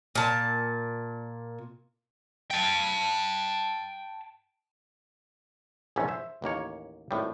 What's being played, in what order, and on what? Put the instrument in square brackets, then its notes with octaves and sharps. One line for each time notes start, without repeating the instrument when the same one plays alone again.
[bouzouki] A#2 A5
[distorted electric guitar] G5 A5
[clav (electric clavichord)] A#1 E2 G#2 E3 A3 C#4
C5 E5
A1 D#2 A#3 C#5
G#1 A2 G3